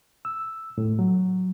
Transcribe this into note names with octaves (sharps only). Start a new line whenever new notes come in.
E6
A2
F#3